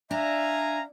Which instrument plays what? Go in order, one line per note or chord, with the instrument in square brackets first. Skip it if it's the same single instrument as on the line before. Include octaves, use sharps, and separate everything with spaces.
[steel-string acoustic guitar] D4 [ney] E5 [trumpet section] F5 G#5 A#5